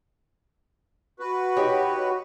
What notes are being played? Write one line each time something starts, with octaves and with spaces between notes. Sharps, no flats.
F#4 B4
D#4 G4 C#5